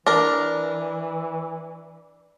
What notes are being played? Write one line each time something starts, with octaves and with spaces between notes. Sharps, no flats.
E3 D4 A#4